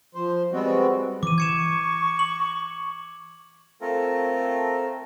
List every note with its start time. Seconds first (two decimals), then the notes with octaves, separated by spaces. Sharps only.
0.15 F3 C5
0.52 G3 G#3 B3 C4 F#4
1.23 E3 D6 D#7
1.38 C#6 G#6 C#7 E7
2.19 F#7
3.81 A3 C4 F4 A4 A#4